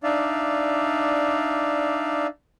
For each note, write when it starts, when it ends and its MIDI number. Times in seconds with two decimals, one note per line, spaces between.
0.04 2.27 62
0.04 2.27 63
0.04 2.27 74
0.04 2.27 76
0.04 2.27 77